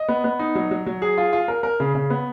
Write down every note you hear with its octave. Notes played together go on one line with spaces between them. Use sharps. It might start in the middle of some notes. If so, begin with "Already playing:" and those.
Already playing: D#5
B3
B3
D#4
F#3
F#3
F#3
G#4
F4
F4
A#4
A#4
C#3
C#3
B3